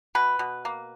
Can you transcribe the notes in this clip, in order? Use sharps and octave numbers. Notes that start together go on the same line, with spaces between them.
B2 B4
B2
A#3